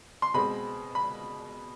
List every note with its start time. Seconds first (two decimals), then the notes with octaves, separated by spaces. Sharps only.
0.22 C6
0.34 B2 G#3 C4 B5
0.95 B5